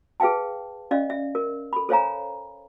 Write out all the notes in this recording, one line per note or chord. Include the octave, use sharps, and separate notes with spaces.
G#4 B4 F5 G5 A5
C#4 D5 D#5 F5
E5
A#4
A4 B5
A4 C5 C#5 F5 G#5 A#5